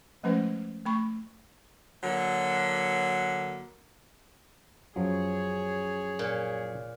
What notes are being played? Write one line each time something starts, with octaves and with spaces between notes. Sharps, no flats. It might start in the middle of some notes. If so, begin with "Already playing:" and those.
F3 G#3 A3 C#4 B4 C5
A3 B5 C#6
D3 F#3 A#3
F#2 F3 F#3 G#4 C#5
A#2